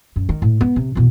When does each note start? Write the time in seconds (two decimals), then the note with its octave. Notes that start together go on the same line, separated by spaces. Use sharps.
0.16 F#2
0.29 D#3
0.42 A2
0.61 B3
0.76 C3
0.95 E2 B2